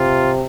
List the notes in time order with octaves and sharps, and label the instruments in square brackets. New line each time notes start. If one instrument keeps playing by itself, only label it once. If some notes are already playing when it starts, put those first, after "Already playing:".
Already playing: [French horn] C3 [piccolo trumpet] F4